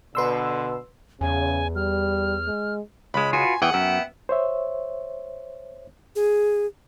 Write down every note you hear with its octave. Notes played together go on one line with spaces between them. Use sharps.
B2 D3 B4 C6 E6
E2 C#3 G#5
G3 F6
G#3
C#2 G#3 B5
F4 F#4 B4 G#5
E2 E3 G#4 F#5 G5
F#2 B3 E5 G5
C5 C#5 E5
G#4